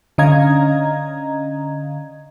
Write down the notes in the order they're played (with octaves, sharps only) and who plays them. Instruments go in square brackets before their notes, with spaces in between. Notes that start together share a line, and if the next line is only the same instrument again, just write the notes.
[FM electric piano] D3 C#4 D#5 F5 A#5 G#6